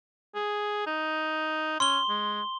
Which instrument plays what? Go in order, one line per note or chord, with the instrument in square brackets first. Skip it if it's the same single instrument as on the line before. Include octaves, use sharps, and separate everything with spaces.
[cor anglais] G#4
D#4
[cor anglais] C#4 [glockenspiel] C6 G7
[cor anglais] G#3